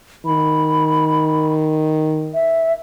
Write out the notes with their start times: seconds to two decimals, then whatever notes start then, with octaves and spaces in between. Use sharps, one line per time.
0.26 D#3 B5
2.34 E5